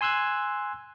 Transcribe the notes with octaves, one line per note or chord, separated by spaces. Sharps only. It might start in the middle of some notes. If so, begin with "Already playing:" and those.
G#5 C6 E6 F#6 G#6